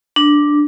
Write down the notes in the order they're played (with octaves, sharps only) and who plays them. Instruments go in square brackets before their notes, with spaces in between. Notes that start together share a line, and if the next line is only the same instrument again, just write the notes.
[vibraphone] D4